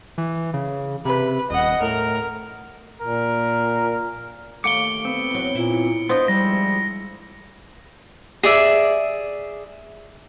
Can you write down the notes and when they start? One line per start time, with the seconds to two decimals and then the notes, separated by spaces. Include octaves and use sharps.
0.18 E3
0.54 C#3
1.05 C3 B4
1.50 D#1 D#5 F#5
1.82 A2 A#4
3.01 A#2 A#4
4.64 D#2 A3 F5 D6 C#7 D7 G7
5.05 B3 C4
5.31 E2 F#3
5.55 A#2 E4
6.09 B3 D4 F4 C5 D#5
6.28 F3 G3 G#3 E4 A#6
8.43 G#4 D5 E5